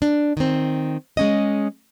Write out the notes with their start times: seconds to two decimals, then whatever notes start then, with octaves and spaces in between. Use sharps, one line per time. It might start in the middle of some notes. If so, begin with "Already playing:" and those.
0.02 D4
0.37 D#3 C4
1.17 G#3 C#4 D#5